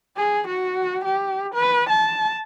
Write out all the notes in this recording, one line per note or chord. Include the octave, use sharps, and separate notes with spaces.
G#4
F#4
G4
B4
A5